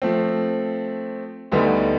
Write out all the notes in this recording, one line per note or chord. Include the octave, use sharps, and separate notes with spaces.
F3 A3 C4
D2 D3 G3 B3 D#4